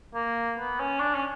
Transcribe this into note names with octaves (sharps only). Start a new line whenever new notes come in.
A#3
B3
C#4
D4
C#4